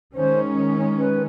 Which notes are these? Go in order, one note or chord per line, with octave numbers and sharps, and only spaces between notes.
D#3 G#3 C#4 C5
B4